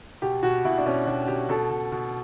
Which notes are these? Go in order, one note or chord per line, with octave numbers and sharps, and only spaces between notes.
B2 G4
B2 F#4
B2 E4
D4
B2 C#4
B2 D4
B2 G4
B2 A4
B2
B2